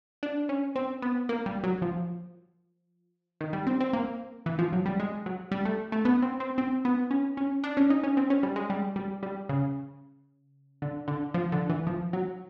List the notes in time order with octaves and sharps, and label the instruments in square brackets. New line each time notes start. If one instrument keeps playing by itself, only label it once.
[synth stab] D4
C#4
C4
B3
A#3
G3
F#3
F3
D#3
G3
C4
C4
A#3
E3
F3
F#3
G3
G#3
F#3
G3
A3
A3
B3
C4
C4
C4
B3
C#4
C#4
D4
C#4
D#4
C#4
C4
C#4
G3
G#3
G3
G3
G3
C#3
D3
D3
F3
D3
E3
F3
F#3